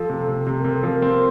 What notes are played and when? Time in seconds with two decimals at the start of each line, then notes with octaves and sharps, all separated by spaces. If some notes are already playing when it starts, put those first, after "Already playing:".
Already playing: F3 A4
0.10 C3
0.28 C3
0.47 C3
0.60 C3 A#4
0.73 A4
0.83 F3 A#4
1.02 C4